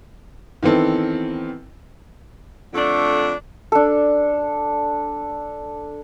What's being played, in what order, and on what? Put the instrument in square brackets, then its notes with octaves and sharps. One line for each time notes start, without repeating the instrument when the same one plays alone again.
[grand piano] D#3 E3 B3 C4 A4
[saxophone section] F2 D3 A3 D4
[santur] D4 A4